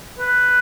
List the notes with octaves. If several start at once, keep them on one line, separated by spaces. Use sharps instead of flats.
B4